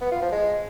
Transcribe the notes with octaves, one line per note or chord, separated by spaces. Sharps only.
B3
F4
F3
G#3